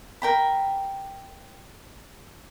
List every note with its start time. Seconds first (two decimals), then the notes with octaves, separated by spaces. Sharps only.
0.22 A#4 G5 B5